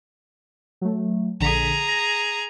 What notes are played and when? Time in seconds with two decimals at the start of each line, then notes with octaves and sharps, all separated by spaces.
0.81 F#3 A3
1.40 A#1 D3 G#4 A#5 B6
1.88 A#6